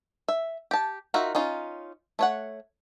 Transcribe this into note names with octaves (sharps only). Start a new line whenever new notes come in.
E5
G4 A5
D#4 F4 F#4 A#4 E5
C#4 D#4 F4
A3 C#5 F#5